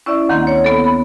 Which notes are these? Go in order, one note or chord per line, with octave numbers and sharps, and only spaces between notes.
C#4 E4 D5 E5
D2 D#3 A#3 C4 F#5
C#5
B3 A4
B3 B5